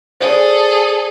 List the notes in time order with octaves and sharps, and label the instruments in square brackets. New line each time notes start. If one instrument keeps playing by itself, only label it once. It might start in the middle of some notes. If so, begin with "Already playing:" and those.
[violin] G#4 A4 [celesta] C5 D5